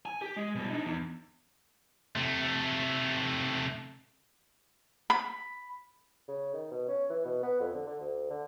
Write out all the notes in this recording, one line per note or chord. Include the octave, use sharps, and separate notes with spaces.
G#5
G4
G#3
B2 G3
D4 D#4
E2
C3 A3
B5
C#3
D#3
B2
C#4
E3
B2
B3
F2
D3
D3
D2
D3